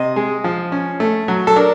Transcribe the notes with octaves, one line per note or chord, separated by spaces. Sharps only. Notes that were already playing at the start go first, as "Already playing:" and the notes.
Already playing: C3 D#5
G#3
F3
C#4
A3
F#3
A4
D4 A#4